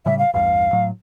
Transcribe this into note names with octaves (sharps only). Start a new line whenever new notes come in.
A2 C#3 G3 E5
F5
A1 E2 G2 F5
A2 F#3